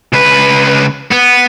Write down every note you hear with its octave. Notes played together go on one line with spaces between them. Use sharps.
C#2 B4
B3